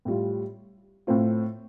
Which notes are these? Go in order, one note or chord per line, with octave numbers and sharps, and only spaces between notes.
A2 G3 F4
A2 A3 C4 F4